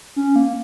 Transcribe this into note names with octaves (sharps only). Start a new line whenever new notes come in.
C#4
A#3